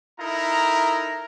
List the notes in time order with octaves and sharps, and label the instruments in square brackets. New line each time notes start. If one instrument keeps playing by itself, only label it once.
[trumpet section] D#4 E4 A4 A#4 A#5